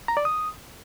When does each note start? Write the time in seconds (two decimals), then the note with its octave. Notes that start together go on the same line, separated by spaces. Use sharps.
0.08 A#5
0.17 D5
0.25 D#6